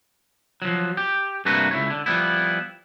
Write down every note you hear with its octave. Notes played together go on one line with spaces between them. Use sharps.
F3 F#3
G4
G2 C3 A3 A#3 F#4 B4
C#2 E4 C#5
D3
F3 G3 B3 E4